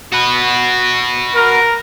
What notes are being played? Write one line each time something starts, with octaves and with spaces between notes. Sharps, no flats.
F#4 B4
A#4